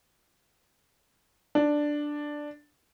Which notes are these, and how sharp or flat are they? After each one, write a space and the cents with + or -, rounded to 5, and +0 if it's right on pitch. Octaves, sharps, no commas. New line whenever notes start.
D4 +5